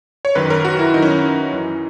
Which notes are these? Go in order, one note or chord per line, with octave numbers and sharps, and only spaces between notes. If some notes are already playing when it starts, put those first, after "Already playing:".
C#5
F#2 D#3 F#3 B4
A#4
F#4
E4
F#2 D#3 F#3 D#4
C#4
D#4
F#2 E3